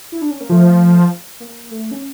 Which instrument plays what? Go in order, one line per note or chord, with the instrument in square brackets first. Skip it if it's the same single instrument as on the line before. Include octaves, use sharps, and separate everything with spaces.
[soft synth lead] E4
D4
C#4
A#3
[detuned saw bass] F3 [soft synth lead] A3
[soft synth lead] A#3
A3
C#4